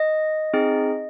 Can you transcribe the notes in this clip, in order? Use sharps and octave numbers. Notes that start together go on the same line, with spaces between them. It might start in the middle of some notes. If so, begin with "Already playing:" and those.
Already playing: D#5
C4 D#4 G#4